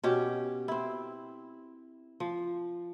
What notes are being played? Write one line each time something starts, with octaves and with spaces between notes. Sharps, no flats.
B2 C#4 G4
C4 E4
F3